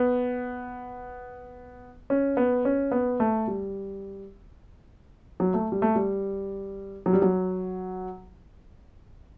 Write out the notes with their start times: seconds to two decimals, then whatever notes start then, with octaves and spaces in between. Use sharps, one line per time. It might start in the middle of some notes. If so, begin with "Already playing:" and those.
Already playing: B3
2.10 C#4
2.37 B3
2.65 C#4
2.92 B3
3.20 A3
3.47 G3
5.40 F#3
5.54 A3
5.72 G3
5.82 A3
5.95 G3
7.06 F#3
7.13 G3
7.22 F#3